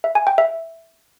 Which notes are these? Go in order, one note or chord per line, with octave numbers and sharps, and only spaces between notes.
E5
G#5
G5
E5